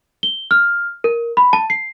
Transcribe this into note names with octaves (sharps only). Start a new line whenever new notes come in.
G7
F6
A#4
B5
A5
C7